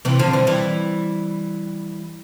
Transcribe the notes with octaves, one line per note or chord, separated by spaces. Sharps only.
C3 E3
D3 F3
E3 G3
E3 G3